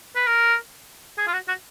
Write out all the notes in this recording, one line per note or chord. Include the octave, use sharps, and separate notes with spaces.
B4
A#4
G#4
F4
F#4
F#4